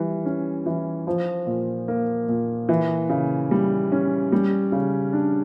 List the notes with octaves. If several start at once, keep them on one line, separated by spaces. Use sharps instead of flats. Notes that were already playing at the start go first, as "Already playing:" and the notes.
Already playing: E3 G3
C#4
E3
F3
A#2
A#3
A#2
E3
C#3
G3
C#4
G3
C#3
D4